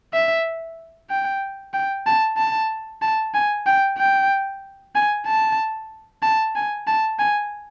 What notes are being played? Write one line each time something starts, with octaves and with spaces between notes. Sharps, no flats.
E5
G5
G5
A5
A5
A5
G#5
G5
G5
G#5
A5
A5
G#5
A5
G#5